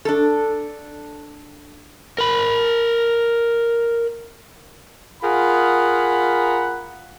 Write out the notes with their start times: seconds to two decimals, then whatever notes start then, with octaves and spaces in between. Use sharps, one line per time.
0.05 D4 A4
2.18 A#4 B5
5.23 F4 G#4 A#4 F#5 B5